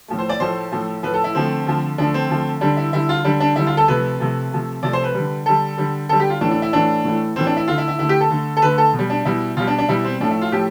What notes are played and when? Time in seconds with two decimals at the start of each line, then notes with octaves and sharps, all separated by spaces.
0.08 A2 F3 A3
0.19 C5
0.29 D5
0.40 A2 F3 A3 C5
0.72 A2 F3 A3
1.03 A2 F3 A3 B4
1.14 A4
1.24 E4
1.34 D3 F3 A3 C4
1.66 D3 F3 A3
1.98 D3 F3 A3 D4
2.14 C4
2.29 D3 F3 A3
2.61 D3 G3 D4
2.77 E4
2.93 D3 G3 E4
3.09 F4
3.24 D3 G3 D4
3.40 D4
3.56 D3 G3 E4
3.67 F4
3.77 A4
3.88 C3 F3 A3 B4
4.20 C3 F3 A3
4.51 C3 F3 A3
4.83 C3 F3 A3 D5
4.93 C5
5.04 B4
5.14 D3 G3
5.46 D3 G3 A4
5.77 D3 G3
6.09 D3 G3 A4
6.20 G4
6.30 F4
6.41 A2 E3 A3 D4
6.51 D4
6.62 E4
6.73 A2 E3 A3 D4
7.04 A2 E3 A3
7.36 A2 E3 A3 C4
7.47 D4
7.57 E4
7.68 D3 A3 F4
7.78 E4
7.88 E4
7.99 D3 A3 E4
8.09 G4
8.21 A4
8.31 D3 A3
8.57 A4
8.62 D3 A3 B4
8.78 A4
8.93 B2
8.99 G3
9.10 D4
9.25 B2 G3 E4
9.57 B2 F4
9.60 G3
9.67 D4
9.78 D4
9.89 B2 G3 E4
10.05 C4
10.20 A2 F3 A3 D4
10.31 E4
10.42 F4
10.52 A2 F3 A3 G4